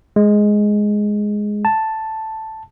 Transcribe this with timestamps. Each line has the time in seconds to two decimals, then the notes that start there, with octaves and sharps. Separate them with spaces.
0.16 G#3
1.65 A5